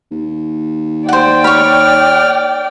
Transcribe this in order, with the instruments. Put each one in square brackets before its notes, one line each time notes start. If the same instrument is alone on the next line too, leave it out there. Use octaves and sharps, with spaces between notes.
[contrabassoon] D#2
[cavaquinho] C5 F#5 [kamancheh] D5 G5
[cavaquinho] C#5 B5 [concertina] F6